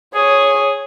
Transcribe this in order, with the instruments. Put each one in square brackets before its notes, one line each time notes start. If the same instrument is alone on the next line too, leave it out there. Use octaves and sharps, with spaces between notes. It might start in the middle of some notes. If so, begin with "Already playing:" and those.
[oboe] G#4 [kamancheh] C#5